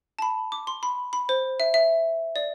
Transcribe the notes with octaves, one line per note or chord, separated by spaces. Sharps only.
A5
B5
D6
C6
B5
B5
C5
E5
E5
D5